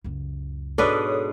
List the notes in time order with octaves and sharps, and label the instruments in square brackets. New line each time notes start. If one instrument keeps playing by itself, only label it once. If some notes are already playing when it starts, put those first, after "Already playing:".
[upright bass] C#2 F#2
[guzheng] G#2 B2 [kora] D4 B4 [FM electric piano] A4 C#5 D#6